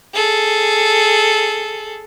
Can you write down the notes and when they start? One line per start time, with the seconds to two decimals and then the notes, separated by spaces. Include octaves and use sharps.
0.15 G#4 A4